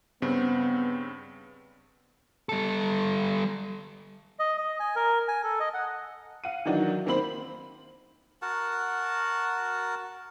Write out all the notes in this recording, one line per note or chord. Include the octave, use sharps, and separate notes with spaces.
G2 C#3 B3 C4
G3 A4
D#5
D#5
G#5
A#4
G#5
A4
D#5
F#5
F5 F#5 D#7
D#3 E3 F#3 D4 D#4 F#4
D#3 A#3 C4 C5 B5 F#7
F#4 A#4 F#5 A5